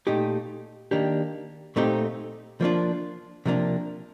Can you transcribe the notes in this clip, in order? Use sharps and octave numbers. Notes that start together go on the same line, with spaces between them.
A#2 A3 D#4 G4
D#3 A#3 D4 G4
A#2 A3 C4 D#4 G4
F3 A#3 D4 F4
C3 F3 A#3 D4